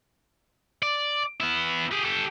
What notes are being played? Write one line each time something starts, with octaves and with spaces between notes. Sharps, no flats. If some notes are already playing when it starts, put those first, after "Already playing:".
D5
B3 E4
G4 G#4
G4 A4